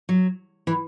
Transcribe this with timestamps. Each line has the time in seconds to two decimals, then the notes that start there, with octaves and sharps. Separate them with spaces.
0.09 F#3
0.67 E3